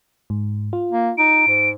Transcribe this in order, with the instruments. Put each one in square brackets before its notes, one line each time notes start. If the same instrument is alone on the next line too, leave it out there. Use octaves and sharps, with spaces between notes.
[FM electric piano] G#2
F4
[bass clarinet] A#3
[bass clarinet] D#4 [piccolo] D7
[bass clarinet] G#2